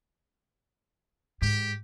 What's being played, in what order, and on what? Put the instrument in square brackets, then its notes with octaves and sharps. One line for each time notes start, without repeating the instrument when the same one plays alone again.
[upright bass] G#2 [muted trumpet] G4